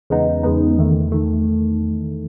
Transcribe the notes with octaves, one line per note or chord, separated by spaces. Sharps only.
E2 C#3 G#3 B3 D#4
E2 C#3 G#3 B3 D#4
E2 D#3 A3
D#3 A3